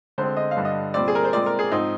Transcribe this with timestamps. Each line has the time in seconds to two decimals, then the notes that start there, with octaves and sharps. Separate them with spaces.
0.18 D3 G#3 C4 C5
0.37 D#5
0.51 F5
0.57 G2 D3 G3
0.65 D#5
0.94 A#2 G3 C4 D5
1.08 G#4
1.15 A#4
1.24 C5
1.33 A#2 G#3 C4 D5
1.46 A#4
1.59 G#4
1.71 G#2 F3 C4 D#4